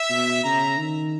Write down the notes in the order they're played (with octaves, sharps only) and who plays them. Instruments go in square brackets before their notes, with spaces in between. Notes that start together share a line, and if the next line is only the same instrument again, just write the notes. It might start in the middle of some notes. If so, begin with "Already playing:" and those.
Already playing: [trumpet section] E5
[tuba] B2
[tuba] C#3 [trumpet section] A#5
[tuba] D#3